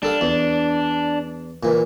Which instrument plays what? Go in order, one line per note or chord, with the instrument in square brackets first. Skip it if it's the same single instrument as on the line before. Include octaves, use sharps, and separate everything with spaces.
[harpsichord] G3 A4 F5 [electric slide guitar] D4
[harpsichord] E2
A#2 E3